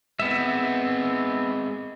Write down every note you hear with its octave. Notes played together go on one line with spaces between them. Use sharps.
G#3 B3 C4 E5